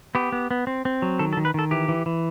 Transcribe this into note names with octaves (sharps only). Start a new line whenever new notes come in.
B3 G4
B3
B3
C4
C4
F#3
D#3 A4
A4
D#3
B4
D#3 A4
E3 G4
E3
E3